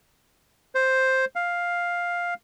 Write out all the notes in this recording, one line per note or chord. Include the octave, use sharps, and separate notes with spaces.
C5
F5